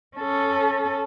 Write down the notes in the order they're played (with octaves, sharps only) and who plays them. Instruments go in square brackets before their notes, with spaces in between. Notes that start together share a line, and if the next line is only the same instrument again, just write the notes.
[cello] C#4 A4